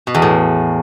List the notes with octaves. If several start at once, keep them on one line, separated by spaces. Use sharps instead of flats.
B2
E2
A2